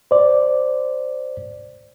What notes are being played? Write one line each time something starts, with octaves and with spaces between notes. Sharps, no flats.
C5 D5